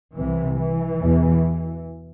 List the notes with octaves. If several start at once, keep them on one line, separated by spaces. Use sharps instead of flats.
C2 C3 E3
E3
E2 B2